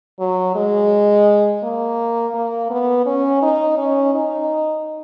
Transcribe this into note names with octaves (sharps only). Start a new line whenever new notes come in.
F#3
G#3
A#3
A#3
B3
C#4
D#4
C#4
D#4